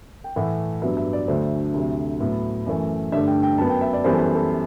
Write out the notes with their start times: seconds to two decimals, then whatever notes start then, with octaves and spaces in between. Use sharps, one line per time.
0.24 G5
0.36 A2 E3 A3 F#5
0.82 G2 F#3 B3 E5
0.97 E5
1.13 D5
1.28 D2 D3 F#3 A3 C5
1.74 D2 C3 F#3 A3
2.20 A2 F#3 B3
2.66 F#2 E3 A3
3.12 G2 D3 A3 E5
3.27 G5
3.43 G5
3.58 F#2 F#3 B3 A5
3.70 G5
3.81 E5
3.93 D5
4.04 F#2 E3 G3 B3 C5
4.13 A4
4.19 B4
4.35 A4